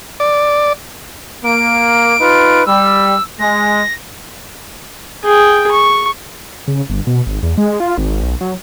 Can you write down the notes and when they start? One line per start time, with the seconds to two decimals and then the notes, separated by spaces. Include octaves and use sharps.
0.20 D5
1.45 A#3 D7
2.19 D#4 F4 B4
2.66 G3 E6
3.40 G#3 A#6
5.24 G#4 G5
5.72 C#6
6.68 C#3
6.90 G1
7.07 B2
7.27 G#1
7.43 E2
7.58 G#3
7.80 F4
7.98 G#1
8.22 B1
8.41 F#3